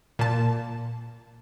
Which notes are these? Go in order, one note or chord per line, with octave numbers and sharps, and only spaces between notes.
A#2 A5